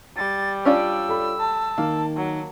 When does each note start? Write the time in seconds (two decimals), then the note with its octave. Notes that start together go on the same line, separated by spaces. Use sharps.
0.17 G3 A6
0.65 C#4 D4 F4 E6
1.09 A4 B5
1.40 A5
1.78 D#3 A#3
2.17 F#3